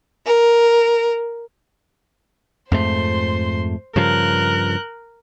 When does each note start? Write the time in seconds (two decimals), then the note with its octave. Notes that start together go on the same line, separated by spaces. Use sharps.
0.25 A#4
2.72 F2 G#2 A3 C5 C6
3.96 G2 C#3 F3 A#4 F#6 G6